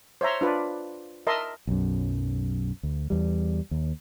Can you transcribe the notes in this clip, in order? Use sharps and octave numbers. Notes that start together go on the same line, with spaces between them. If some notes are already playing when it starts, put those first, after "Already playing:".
C5 C#5 E5 A#5 C6
D4 F4 B4 D5
A#4 D#5 E5 A5 C6
B1 F#2
D2
E2 G3
D#2